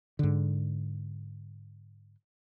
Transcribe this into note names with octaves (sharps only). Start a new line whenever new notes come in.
G#2 D3